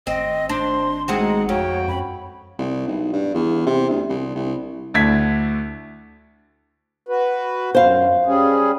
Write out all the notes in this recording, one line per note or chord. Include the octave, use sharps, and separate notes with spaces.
G#1 C4 D#5
D4 C5 C6
G#3 C4 D#4 F#4 F#5
F2 F#4 C#5 G5
F#2 B5
C2
B1
G2
E2
C3
D2
C2
C2
D2 D3 E4 G#6 B6
F#4 B4
F#2 C5 F5
G3 C#4 G#4